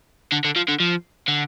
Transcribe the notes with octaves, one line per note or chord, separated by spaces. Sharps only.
D3
D3
F3
D3
F3
D3